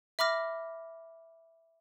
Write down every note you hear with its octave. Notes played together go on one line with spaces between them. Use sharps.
E5 B5 D6 F6 A#6